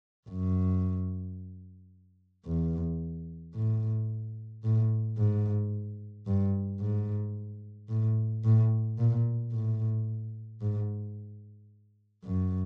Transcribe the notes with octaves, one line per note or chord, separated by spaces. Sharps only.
F#2
E2
A2
A2
G#2
G2
G#2
A2
A2
A#2
A2
G#2
F#2